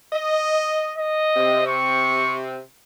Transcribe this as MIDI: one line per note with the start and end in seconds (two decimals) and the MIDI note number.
0.13 0.91 75
0.98 1.64 75
1.37 2.60 48
1.37 2.60 60
1.67 2.39 85